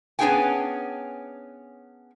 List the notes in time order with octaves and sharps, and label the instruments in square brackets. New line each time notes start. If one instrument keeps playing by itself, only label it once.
[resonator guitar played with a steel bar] B3 C#4 D4 G#4 G5 G#5